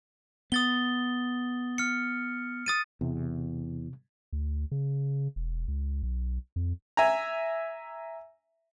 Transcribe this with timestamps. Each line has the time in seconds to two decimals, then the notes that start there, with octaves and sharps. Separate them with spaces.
0.52 B3 D#6 A6 G7
1.78 F6 C#7
2.66 D#6 A6 D#7
3.01 E2 C3
4.33 D2
4.71 C#3
5.36 E1
5.68 C#2
6.03 B1
6.56 F2
6.97 E5 G#5 A#5